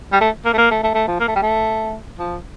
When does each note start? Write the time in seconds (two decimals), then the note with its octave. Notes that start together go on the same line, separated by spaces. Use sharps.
0.12 G3
0.21 A3
0.45 A#3
0.54 A3
0.58 A#3
0.71 A3
0.83 A3
0.95 A3
1.08 F3
1.20 A#3
1.28 A3
1.35 G3
1.42 A3
2.19 F3